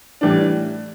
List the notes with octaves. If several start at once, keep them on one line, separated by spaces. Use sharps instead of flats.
A2 E3 G3 D4